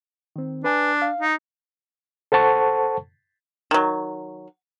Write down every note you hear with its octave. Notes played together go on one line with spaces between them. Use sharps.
D#3 C4
D4 B4 G#5
F5
D#4
A4 C5 F#5 A5 C#6
D#3 F#3